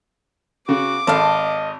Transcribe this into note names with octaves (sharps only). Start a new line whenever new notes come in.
C#3 F#4 D6
G#1 A4 D#5 F5